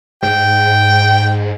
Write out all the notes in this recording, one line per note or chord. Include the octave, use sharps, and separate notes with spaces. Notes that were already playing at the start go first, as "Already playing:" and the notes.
G#2 G5